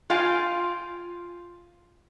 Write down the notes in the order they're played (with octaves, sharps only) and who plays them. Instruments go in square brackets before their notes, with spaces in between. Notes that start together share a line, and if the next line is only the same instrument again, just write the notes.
[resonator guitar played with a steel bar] F4 F5 G5 G#5